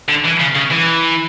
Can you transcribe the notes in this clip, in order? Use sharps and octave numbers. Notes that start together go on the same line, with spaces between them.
D3
E3
C#3
C#3
E3